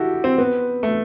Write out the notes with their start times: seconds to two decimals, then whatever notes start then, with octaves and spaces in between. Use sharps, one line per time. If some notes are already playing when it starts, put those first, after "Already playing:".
Already playing: E4 F#4 G4 A4
0.24 C4
0.38 B3
0.83 A3